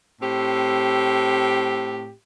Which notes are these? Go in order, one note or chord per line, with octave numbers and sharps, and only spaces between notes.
A2 C4 G4